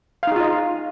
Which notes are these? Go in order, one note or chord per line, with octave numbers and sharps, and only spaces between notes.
D#4 F4 G#4 D#5 F5